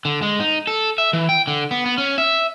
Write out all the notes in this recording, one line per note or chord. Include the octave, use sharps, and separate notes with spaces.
D3
G#3
D#4
A4
E5
E3
G5
D3
B3
B3
C#4
E5